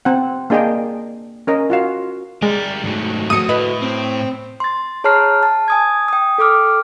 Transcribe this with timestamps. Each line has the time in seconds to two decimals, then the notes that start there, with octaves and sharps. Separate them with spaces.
0.05 C4 F#5
0.50 A#3 D4 G#4 D#5 F5 G5
1.47 C#4 A#4 D#5
1.70 F4 F#4 F5
2.42 G3 G#3 A#4 D5
2.84 G#2 D#3 F#3 A3
3.30 A3 F#4 D#6 C#7 D#7
3.49 A2 B4 D#5 B5
3.81 C4 C5
4.60 C6 A6
5.04 G#4 C#5 A5 A#5 F6 C7
5.43 A5
5.68 G#5 D#6 G#6
6.08 G5 D#6
6.38 A4 G5 D6 F6